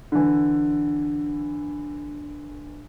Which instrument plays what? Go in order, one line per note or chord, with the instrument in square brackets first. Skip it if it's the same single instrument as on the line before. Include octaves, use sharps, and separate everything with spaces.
[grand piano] D3 E3